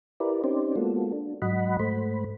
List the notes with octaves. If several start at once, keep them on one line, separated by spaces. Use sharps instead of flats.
E4 G4 A#4 B4 D5
C4 C#4 D#4 G4 C5 D5
G#3 A#3 B3 F4 F#4 A4
D4
G#2 F#3 D#5 F#5 B5
G#2 A3 C5 B5